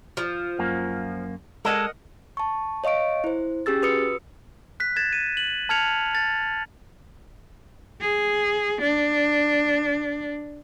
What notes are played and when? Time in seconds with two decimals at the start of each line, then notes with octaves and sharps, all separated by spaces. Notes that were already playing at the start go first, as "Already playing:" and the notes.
0.17 F3
0.59 F#2 A#3
1.65 G#3 A4 A#4 D#5 F#5
2.37 A5 C#6
2.84 C#5 D#5 F5 C#6 D7
3.24 E4 C5
3.66 C#4 G4 G#4 E6 A6
3.83 F#4 B4 D#6 E6 C#7
4.80 F#6 B6
4.96 G#6 A6 E7
5.13 D#7
5.37 F#7
5.69 A5 F6 G#6 C#7 F7
6.15 A6
8.01 G#4
8.81 D4